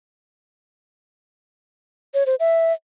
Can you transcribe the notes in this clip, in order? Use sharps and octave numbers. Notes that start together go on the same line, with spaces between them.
C#5
C5
E5